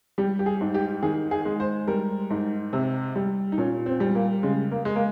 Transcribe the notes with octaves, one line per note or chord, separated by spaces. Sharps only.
G3 G4
G4
G#4
G#2
G4
D#3 G#4
G#4
G#3
C5
G3 A#4
G#2
C3
G3
D#4
A#2 C#4
C4
G3
A#3
C#3 G#3
A#3
G#3
A#3